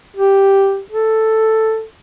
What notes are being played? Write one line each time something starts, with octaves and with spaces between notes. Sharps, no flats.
G4
A4